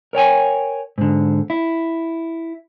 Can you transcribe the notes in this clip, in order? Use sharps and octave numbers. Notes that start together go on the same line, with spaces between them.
A#4 C#5 G5 G#5
G#2 D3
E4